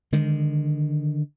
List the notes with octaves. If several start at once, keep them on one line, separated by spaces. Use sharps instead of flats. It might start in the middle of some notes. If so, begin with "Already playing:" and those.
D3 D#3 G#3